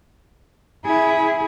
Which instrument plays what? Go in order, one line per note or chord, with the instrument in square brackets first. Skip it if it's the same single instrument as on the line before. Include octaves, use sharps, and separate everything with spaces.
[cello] E4 G#4